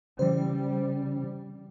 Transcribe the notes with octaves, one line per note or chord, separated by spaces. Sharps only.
C#3 E3 G3 C#4 C5